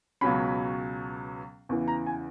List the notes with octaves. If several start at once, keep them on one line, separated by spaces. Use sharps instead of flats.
C#2 B2 F#3 C#4 B5
E2 C#3 E3
A#5
G#5